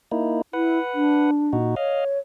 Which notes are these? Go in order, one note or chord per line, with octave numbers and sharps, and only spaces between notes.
A#3 D#4 E4
E4 B4 F#5
D4
A#2 D#4 F#4
C#5 D#5 F5